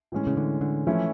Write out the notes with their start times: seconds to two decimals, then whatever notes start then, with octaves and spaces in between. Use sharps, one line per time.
0.12 A2 E3 G#3 C#4
0.27 C#3
0.37 D3
0.61 D3
0.87 E3 F3 A3 C#4 E4